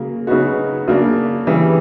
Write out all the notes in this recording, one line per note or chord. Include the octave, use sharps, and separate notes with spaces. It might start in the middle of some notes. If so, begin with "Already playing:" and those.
Already playing: C#3 F#3 A#3
C#3 F#3 B3 D#4 F#4
C#3 F#3 A#3 D4
C#3 E3 G3